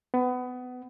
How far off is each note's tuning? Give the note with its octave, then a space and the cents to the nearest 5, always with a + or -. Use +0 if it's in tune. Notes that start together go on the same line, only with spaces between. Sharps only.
B3 +25